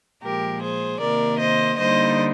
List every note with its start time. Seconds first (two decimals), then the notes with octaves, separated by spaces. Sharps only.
0.22 A#2 F3 G#3 G4 A#4
0.61 G#4 C5
0.99 C3 D#3 A#3 A#4 D5
1.38 C5 D#5
1.77 D3 G3 A#3 D#4 C5 D#5